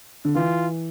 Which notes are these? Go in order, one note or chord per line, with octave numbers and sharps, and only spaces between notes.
D3
E3 F4